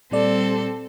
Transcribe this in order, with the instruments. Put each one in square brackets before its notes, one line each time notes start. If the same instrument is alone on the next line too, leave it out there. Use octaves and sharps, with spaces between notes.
[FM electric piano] A#2 G3 D5 [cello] C4 A4